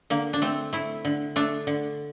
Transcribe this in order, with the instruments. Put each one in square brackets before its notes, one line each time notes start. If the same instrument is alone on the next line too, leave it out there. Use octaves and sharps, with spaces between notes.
[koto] D3 A#3
D4
A3 C4
A3 E4
D3
A3 D4
D3